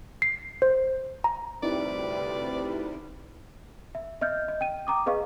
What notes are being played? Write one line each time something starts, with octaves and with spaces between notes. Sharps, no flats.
C7
C5
A#5
D2 C3 G3 C4 D#4 E4 B4 D5
E5
D#5 E5 F6 G6
D#5
G5 D#7
G5 A#5 D6 D#6
G#4 B4 D#5 F5 C#6